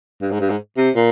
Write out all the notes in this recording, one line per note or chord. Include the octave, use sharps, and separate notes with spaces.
G2
G#2
G2
G#2
C3
A#2